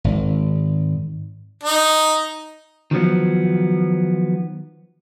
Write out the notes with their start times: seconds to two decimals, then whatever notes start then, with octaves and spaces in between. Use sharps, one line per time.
0.04 G#1
1.63 D#4
2.91 D#3 F3 F#3 B3